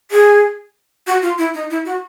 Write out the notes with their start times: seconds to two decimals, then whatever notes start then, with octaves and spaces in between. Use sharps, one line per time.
0.11 G#4
1.07 F#4
1.22 F4
1.38 E4
1.54 D#4
1.70 E4
1.85 F#4